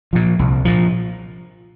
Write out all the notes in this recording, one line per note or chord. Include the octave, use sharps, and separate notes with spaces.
A#2 F3
C2
A#2 F3